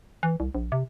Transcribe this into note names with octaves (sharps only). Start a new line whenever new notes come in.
E3
C2
A#1
C3